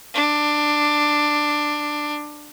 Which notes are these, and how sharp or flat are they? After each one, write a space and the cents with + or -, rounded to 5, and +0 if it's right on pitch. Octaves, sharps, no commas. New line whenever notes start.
D4 +15